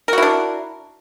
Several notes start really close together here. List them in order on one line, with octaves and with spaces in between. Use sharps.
A#4 F#4 E4 D4